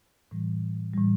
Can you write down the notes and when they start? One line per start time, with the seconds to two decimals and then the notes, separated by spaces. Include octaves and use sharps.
0.31 A2 E3 G3
0.93 A2 E3 G3